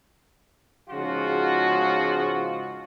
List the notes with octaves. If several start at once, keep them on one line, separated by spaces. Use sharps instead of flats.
G#2 C#3 F3 G#3 F4 F#4